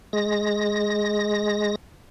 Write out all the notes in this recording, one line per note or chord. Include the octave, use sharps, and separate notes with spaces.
G#3 A#6